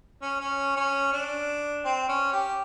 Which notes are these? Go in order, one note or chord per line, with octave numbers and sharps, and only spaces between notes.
C#4
C#4
C#4
D4
C4
C#4
G4